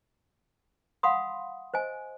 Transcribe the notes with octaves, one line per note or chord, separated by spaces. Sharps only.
F5 F#5 B5 C6 D#6
C5 D#5 G#5